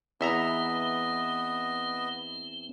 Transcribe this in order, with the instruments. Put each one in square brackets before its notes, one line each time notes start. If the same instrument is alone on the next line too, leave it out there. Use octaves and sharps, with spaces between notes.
[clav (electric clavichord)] E2 E5 A#5 [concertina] B3 D#5 [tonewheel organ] C4